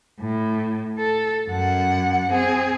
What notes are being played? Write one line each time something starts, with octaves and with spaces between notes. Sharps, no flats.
A2
A4
F#2 F#5
C4 G#4